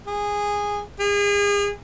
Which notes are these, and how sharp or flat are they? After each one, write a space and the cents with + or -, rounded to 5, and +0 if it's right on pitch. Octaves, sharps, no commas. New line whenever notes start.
G#4 -15
G#4 -35